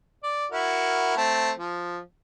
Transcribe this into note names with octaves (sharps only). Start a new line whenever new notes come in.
D5
E4 F#4 A#4
A3 C4 A5
F3